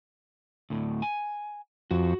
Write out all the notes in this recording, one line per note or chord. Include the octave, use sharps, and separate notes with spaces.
D2 A2
G#5
F2 F#4